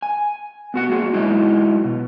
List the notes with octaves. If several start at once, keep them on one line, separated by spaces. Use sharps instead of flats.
G#5
B3 F#4 F#5
A#3 F#4 G#4
F#3 G#3 D#4 E4
B2